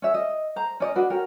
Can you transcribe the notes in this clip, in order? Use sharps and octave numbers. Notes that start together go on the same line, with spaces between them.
C#4 C#5 E5
D#5
C5 A#5
C#4 D5 D#5
D4 F#4 B4
C#4 F#4 A#4 G5